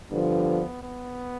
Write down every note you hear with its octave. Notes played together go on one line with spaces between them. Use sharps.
G2 D3 F3 B3
B3